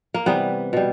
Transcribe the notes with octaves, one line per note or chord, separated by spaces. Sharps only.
A#3
C3 E3 G3 B3
B2 G3